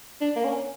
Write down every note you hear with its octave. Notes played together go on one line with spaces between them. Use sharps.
D4
A#3
C#4